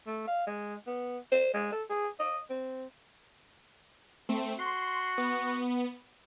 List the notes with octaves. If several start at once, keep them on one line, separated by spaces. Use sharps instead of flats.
A3
F5
G#3
B3
C5
G#3
A4
G#4
D#5
C4
A3 C4
F#4 C6
B3